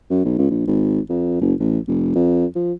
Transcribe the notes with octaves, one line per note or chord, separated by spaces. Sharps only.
F#2
B1
C#2
A#1
G#1
F2
F#1
A1
F1
F2
F3